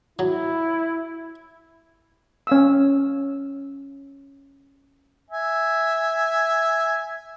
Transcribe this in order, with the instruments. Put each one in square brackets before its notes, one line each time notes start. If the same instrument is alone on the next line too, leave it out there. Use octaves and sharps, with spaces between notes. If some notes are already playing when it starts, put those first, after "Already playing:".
[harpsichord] F#3 [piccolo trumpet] E4
[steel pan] C#4 F5 E6
[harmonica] E5 G#5